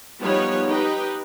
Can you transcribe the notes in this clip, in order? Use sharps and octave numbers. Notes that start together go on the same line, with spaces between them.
F3 G3 B3 D#4 B4 C#5
D#4 G4 B4 D#5 G5